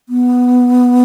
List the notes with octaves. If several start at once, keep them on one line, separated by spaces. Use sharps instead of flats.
B3